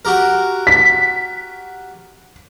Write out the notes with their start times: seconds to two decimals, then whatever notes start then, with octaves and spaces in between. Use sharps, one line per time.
0.05 F#4 G4 A#4
0.67 B6